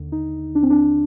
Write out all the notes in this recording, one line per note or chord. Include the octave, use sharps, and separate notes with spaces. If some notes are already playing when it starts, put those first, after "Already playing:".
Already playing: D#2 D3
D#4
D4
C4
D4